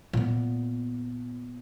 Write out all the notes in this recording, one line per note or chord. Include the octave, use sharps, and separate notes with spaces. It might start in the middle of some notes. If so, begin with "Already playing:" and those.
A#2 B3